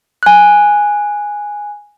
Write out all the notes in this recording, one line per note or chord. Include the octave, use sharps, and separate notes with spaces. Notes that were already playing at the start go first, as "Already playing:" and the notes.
G#5 F#6